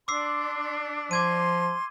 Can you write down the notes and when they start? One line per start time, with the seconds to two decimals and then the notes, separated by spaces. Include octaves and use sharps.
0.08 D4 C6 D6 E6 C7
1.11 F3 C6 D6 G#6 D#7